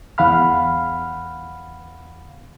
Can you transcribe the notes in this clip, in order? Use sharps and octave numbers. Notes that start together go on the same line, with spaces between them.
E2 F5 F#5 B5 F6